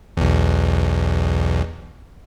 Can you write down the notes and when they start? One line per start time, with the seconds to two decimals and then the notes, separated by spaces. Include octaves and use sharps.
0.17 B1 E2